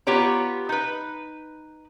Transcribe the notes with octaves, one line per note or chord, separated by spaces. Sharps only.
B3 F4 G4 C#5 A#5
D#4 B4